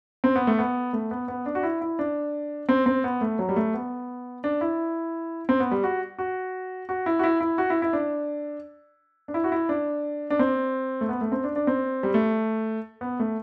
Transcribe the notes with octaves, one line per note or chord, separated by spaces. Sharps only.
C4
B3
A3
B3
A3
B3
B3
D4
F#4
E4
E4
D4
C4
C4
B3
A3
F#3
G3
A3
B3
D4
E4
C4
B3
G3
F#4
F#4
F#4
E4
F#4
E4
E4
F#4
E4
E4
D4
D4
E4
F#4
E4
D4
D4
C4
A3
B3
A3
C4
D4
D4
C4
G3
A3
B3
A3